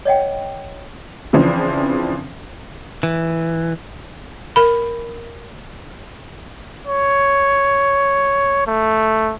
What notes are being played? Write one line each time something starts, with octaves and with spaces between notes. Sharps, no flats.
C#5 D#5 F#5 G5
C#3 E3 F3 C4 D4
E3
A#4 B5
C#5
A3